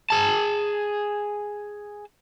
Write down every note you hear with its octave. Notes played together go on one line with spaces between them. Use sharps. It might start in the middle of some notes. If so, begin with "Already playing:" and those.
G#4 A5